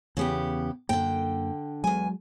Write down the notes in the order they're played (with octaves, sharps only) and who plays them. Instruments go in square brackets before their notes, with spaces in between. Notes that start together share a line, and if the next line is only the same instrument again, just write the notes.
[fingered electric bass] E2 [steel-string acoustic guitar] C#3 B3 G4
[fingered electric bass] F#2 A#3 [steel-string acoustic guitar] D3 G5
[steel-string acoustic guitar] E2 G#5 [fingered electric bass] F#3 G#3